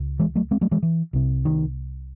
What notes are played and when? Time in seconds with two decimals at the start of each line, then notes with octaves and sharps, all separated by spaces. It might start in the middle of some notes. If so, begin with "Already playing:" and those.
Already playing: C#2
0.19 E3 G#3
0.35 F#3 A3
0.51 G#3 C4
0.61 F#3 A3
0.71 E3 G#3
0.83 E3
1.13 C2 C3
1.45 D#3